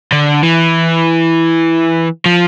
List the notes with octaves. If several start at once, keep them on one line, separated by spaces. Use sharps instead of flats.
D3
E3
F3